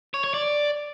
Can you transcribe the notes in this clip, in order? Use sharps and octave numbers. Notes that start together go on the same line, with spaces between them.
C#5
C#5
D5